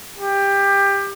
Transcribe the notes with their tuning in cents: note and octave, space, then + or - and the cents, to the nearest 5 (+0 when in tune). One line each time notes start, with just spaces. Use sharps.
G4 +20